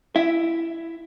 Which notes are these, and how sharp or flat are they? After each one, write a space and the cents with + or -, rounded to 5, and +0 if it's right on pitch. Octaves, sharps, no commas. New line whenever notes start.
E4 +10 E5 +0